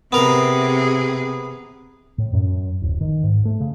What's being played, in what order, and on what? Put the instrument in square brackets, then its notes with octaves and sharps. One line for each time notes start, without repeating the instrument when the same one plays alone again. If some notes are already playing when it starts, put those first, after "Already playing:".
[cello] C3 G#4 [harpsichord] B3 A#4
[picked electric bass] A2
F#2
D1
D#3
G#2
A3
C#3